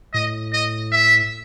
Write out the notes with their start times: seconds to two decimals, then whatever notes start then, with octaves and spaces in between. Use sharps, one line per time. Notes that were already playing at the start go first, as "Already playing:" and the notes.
0.14 A2 D#5
0.53 D#5
0.92 E5